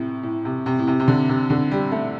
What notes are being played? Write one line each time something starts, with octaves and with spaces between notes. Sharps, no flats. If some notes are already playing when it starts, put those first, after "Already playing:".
Already playing: A2 C3
A2
C3
C3
A2
C3
C3
D3
C3
D3
G3
A3